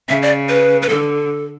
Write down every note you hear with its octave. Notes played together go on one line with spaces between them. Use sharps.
C#3 E5
D5
B4
B4
D3 A4